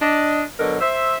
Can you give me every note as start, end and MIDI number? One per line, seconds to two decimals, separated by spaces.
0.02 0.43 62
0.02 0.43 75
0.60 0.78 47
0.60 0.78 50
0.60 0.78 54
0.60 0.78 70
0.81 1.17 72
0.81 1.17 76